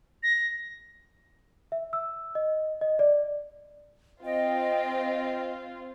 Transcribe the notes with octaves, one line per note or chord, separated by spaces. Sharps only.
A#6
E5
E6
D#5
D#5
D5
C4 F4 D#5 G5